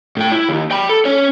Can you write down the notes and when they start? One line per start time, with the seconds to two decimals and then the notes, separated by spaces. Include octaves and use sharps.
0.17 A2 G5
0.32 E4
0.49 D#2
0.71 G5 B5
0.89 A4
1.05 C#4 C#5